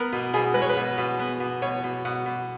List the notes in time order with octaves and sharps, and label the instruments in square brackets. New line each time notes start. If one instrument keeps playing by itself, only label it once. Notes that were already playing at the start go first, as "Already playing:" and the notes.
Already playing: [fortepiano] B3 A#4
B2
B2 G#4
G#3 B4
C#5
B4
B2
B2
B3
B2
B2 C#5
B2
B2 F#5
B2